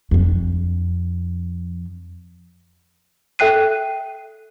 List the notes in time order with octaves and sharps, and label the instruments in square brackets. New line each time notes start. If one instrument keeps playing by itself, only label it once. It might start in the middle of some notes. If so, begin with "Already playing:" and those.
[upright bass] F2 D4
[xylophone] A4 E5 G5 F#6 C7 D#7